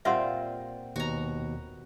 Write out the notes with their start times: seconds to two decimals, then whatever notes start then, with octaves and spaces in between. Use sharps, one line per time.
0.05 A#2 G3 C4 F4 E5 F#5 C6
0.96 D#2 B2 F#4 A#5